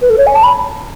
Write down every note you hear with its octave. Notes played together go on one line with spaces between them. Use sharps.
B4
A4
C#5
G#5
A5
B5